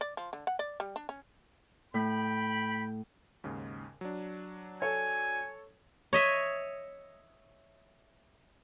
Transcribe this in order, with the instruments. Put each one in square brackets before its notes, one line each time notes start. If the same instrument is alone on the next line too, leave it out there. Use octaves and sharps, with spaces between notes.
[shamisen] D5
F3
D3
F#5
D5
G3
D4
C#4
[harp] A2 [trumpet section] G5 B5
[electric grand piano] D#2 G#2 C#3
F#3 D4
[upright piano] A4 C#5 [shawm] G#5
[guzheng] C#5 D#5 E5